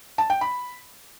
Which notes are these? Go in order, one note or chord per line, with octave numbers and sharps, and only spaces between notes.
A5
G5
B5